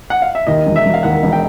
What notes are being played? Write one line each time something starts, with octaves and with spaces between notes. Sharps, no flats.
F#5
F5
E5
D#2 D#5
E1
E5
E1
F5
D#2 F#5
E1
G5